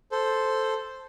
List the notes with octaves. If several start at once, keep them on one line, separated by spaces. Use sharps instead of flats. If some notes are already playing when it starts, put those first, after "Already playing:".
A4 C5